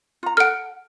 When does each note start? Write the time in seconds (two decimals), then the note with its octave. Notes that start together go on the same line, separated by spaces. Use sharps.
0.23 F4 A#5
0.37 A4 F#5 F6 D7